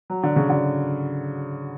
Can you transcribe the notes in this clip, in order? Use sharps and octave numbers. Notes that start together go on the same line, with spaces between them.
F#3
D3
C#3
D3